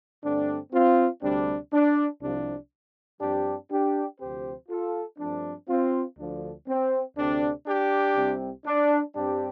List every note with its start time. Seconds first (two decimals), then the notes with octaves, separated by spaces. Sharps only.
0.23 G2 D3 A3 C4 D4
0.73 C4 F4
1.22 D2 C3 G3 C4 D4
1.72 D4
2.21 C2 C3 F3 D4
3.20 G2 F3 C4 D4 G4
3.71 D4 G4
4.20 D2 C3 F3 C4 G4 C5
4.69 F4 A4
5.19 G2 F3 A3 C4 D4
5.68 C4 F4
6.18 D2 D3 F3 D4
6.67 C4
7.17 D2 C3 A3 C4 D4
7.66 D4 G4
8.16 C2 C3 G3 C4
8.66 D4
9.15 G2 G3 C4 D4 G4